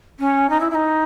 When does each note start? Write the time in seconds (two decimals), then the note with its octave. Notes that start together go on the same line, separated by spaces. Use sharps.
0.19 C#4
0.49 D#4
0.60 E4
0.70 E4
0.74 D#4